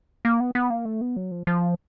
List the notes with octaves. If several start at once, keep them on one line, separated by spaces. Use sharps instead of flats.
A#3
B3
B3
A#3
A3
B3
F#3
F3
F3